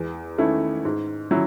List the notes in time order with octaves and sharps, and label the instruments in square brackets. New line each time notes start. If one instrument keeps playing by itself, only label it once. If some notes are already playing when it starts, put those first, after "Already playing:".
Already playing: [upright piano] E2
D#3 A3 C#4 E4
G#2
F#3 C#4 E4